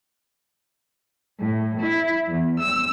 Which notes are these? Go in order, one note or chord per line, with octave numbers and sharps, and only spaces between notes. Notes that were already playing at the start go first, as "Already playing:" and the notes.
A2
E4
E2
E6